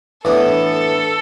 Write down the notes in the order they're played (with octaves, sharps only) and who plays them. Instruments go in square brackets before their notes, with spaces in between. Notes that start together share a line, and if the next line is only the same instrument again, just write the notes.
[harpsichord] A2 E3 B3 D4 [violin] A4